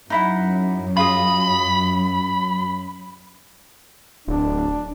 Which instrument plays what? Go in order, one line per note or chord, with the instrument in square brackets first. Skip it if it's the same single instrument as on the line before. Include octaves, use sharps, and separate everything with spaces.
[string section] F#2 [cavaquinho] D#4 E4 F#5
[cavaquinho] F4 G#4 D#5 [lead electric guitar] B5
[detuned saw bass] D1 [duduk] D4